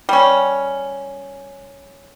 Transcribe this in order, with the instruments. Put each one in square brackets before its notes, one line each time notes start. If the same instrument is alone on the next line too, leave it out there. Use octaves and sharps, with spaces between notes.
[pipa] G3 C#4